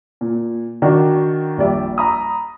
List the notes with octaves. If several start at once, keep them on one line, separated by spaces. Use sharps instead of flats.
A#2
D#3 D4 F#4
A#1 G3 D5 E5
A#5 B5 D#6